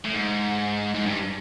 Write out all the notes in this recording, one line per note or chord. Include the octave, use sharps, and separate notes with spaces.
A2
G#2
G#2
G2